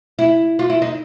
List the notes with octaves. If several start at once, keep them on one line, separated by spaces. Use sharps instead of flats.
E4
F4
E4
D#4